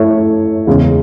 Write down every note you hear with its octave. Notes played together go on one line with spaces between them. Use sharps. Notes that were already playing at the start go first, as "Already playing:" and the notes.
Already playing: A3 E4 A4 C#5 E5
E2 C#3 G#3 C#4